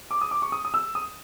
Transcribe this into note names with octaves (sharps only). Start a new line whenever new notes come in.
D6
D#6
D6
C#6
D#6
D#6
E6
D#6